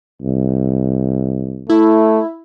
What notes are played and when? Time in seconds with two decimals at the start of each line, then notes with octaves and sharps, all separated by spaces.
0.22 C2
1.70 A3 E4